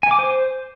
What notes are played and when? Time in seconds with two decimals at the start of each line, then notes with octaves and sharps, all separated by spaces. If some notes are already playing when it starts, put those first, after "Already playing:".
0.03 G#5
0.11 D6
0.19 C5